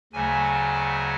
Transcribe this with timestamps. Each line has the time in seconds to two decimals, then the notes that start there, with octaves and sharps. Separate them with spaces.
0.13 D2 C#3 F#3 A3 G#5